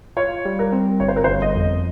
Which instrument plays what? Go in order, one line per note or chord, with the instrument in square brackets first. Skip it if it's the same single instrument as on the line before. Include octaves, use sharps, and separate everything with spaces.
[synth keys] F4 [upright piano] C#5
[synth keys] G3
[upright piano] A#4
[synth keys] C4
[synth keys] G1 [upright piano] C#5
[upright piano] C5
A#4
[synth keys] G1 [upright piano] C5
[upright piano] C#5
D#5
[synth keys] F2